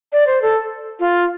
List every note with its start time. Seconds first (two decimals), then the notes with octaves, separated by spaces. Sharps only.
0.12 D5
0.27 C5
0.42 A4
1.00 F4